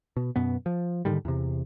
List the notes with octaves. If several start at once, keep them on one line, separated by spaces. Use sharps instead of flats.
B2
F#2 B2 B3
F3
G#2 D3 D#3 G3
E2 C3